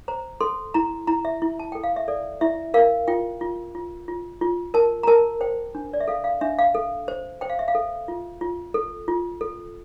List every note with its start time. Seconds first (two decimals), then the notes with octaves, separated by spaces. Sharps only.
0.08 C5 A#5
0.41 A4 C6
0.74 E4 A#5
1.07 E4 A#5
1.25 E5
1.42 E4
1.59 A5
1.72 A4 G5
1.84 F5
1.96 E5
2.08 A4 D5
2.41 E4 E5
2.74 A#4 F5
3.08 F4 G5
3.41 F4
3.75 F4
4.08 F4
4.41 F4
4.74 A#4 A5
5.03 A#5
5.07 A#4 A5
5.41 C5 G5
5.75 D4
5.93 D5
6.00 E5
6.08 A4 F5
6.24 F5
6.41 D4 E5
6.59 F5
6.75 A4
7.08 C5
7.41 C5 G5
7.50 F5
7.59 E5
7.68 F5
7.75 A4
8.08 F4
8.41 F4
8.74 A4
9.08 F4
9.41 A4